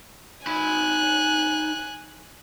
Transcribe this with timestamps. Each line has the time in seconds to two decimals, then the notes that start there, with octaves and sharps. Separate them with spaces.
0.47 D#4 G#5 B5 F#6